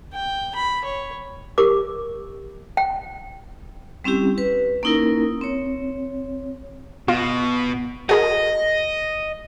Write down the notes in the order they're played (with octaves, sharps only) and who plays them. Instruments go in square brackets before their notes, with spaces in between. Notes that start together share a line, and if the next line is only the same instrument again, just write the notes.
[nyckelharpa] G5
B5
C#5
[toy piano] G4 A#4 D6
G5
[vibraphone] G3 C4 C#4 E4 G4
B4
A#3 C#4 D#4 E4 A#4
C4 C#5
[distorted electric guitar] B2 [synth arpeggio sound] F4
[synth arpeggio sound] F#4 G#4 A#4 [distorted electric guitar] D#5